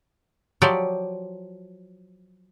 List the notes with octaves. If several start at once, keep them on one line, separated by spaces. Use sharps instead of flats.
F3 F#3 G4 D5